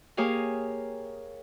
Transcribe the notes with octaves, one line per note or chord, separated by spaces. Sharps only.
A#3 G4 G#4 C#5 F5